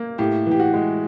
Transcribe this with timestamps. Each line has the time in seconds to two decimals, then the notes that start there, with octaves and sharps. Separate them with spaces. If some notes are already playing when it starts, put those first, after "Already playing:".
Already playing: A#3
0.18 A2 G4
0.47 E3 G4
0.60 F#4
0.74 G#3